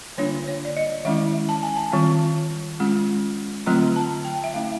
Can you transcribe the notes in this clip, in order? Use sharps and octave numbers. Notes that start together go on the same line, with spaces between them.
D3 G3 A#3 D4 F4 C#5
C#5
D5
D#5
D#3 G#3 C#4 E4 E5
A5
G#5
A5
D#3 G3 C4 F4
G#3 C#4 F4
D3 F#3 A3 C4 F4 A#5
A5
G5
E5
A3 C#4 E4 F5